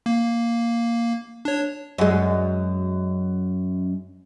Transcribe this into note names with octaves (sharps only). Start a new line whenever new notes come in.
A#3
D4 C#5
F#2 G#3